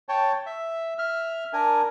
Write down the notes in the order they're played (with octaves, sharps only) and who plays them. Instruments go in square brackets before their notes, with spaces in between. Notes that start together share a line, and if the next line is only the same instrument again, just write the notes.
[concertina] C#5 G5 A5
E5
E5 F6
D4 A#4 G#5